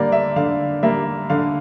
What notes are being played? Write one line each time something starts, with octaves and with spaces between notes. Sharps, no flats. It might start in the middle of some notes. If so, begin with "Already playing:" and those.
Already playing: D3 G3 A#3 D5
E5
D3 F5
G3 A#3 E5
D3 F5